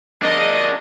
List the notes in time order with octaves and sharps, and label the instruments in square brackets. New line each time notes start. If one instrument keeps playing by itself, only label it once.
[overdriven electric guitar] D4 A#4 [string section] D#5